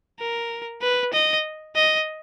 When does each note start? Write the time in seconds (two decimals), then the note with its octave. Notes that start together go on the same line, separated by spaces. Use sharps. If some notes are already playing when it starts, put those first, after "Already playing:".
0.19 A#4
0.82 B4
1.13 D#5
1.75 D#5